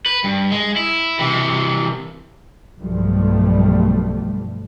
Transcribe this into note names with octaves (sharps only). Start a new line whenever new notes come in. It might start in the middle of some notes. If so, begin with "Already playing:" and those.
B4
G2
G#3
E4
C3 E3
B1 G2 F3 G3 A3